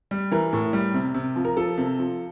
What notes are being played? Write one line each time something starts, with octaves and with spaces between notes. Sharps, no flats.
G3
E3 A#4
A2
G3
C3
C3
F3
A#4
F3 A4
C3
F3